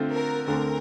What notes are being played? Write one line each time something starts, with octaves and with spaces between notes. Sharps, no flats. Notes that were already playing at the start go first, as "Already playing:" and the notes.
Already playing: D3 A3 C4 F4
A#4
D2 D3 A3 C4 A#4